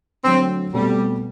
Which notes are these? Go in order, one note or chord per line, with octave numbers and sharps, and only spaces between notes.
D3 F#3 A3 C4
B2 G3 A3 C4